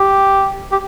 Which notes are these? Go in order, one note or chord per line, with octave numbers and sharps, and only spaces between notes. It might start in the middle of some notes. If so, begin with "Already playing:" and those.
Already playing: G4
G4